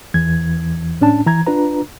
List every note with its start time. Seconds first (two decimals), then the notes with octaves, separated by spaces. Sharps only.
0.14 E2 E3 G#6
1.01 A2 C#4 D4 A5
1.26 E3 A#5 G#6
1.46 D4 F4 B4 A#5